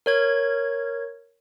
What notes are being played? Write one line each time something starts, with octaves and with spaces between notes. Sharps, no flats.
A#4 C#5 G#6